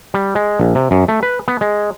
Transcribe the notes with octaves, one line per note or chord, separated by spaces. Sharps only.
G3
G#3
A#1
C3
F#2
A3
B4
B3
G#3